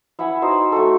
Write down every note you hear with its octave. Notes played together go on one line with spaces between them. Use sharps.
E4 E5 F#5 G#5
D#4 F#4 C5
A3 F#4 A4